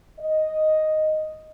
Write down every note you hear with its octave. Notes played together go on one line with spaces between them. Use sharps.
D#5